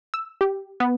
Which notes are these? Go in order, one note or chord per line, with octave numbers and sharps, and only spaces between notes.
E6
G4
B3